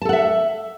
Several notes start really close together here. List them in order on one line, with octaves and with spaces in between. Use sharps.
A5 A4 F#5 E5